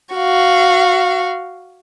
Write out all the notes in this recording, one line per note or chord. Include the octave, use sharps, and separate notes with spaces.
F#4 F5